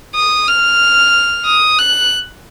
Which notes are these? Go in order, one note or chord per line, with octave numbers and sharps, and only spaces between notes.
D#6
F6
D#6
F#6